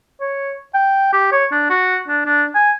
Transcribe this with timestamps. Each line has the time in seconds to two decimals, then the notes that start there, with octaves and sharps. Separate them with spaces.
0.21 C#5
0.74 G5
1.13 G4
1.32 C#5
1.52 D4
1.70 F#4
2.09 D4
2.26 D4
2.55 G#5